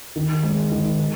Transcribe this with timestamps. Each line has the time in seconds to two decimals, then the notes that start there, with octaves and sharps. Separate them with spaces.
0.16 D#3
0.43 G#3
0.71 D#3
0.99 D#3